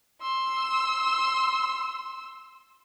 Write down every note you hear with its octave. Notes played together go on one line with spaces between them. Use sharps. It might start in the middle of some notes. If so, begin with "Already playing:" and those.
C6 E6